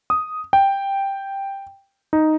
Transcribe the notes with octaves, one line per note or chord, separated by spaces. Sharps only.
D#6
G5
D#4